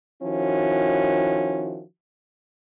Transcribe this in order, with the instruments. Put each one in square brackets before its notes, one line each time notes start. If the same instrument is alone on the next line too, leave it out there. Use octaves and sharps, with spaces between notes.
[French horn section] D#3 F3 C#4 E4 F#4